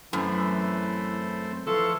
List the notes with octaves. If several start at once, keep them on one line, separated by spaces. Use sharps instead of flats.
F#2 E3 A3 C4 B5
E3 F3 A4 B4 C6 C#6